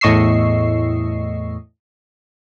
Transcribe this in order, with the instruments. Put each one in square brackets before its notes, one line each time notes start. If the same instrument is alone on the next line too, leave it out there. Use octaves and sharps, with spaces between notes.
[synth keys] E2 A2 D#5 C#6 E6 C7